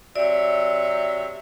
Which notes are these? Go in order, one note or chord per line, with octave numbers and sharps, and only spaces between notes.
C3 F#3 D5 E5